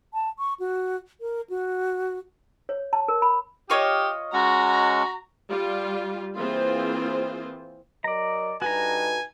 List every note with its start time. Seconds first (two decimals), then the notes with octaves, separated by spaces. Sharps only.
0.14 A5
0.39 C#6
0.60 F#4
1.21 A#4
1.50 F#4
2.69 C#5
2.93 A5
3.08 A#4
3.22 B5
3.70 F4 G4 C#5 D#5
4.33 G#3 C#4 F#4 F#5 A#5
5.47 G3 F4
6.35 E3 A#3 C4 F4 G#4 C5
8.04 F#3 A#4 D5 D#5 A#5
8.62 G2 D#4 F#4 A4 B4 G#5 A#5